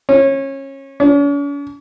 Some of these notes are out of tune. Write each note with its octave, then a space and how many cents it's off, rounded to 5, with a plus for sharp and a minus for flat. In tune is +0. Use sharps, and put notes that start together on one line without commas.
C#4 -25
C#4 +45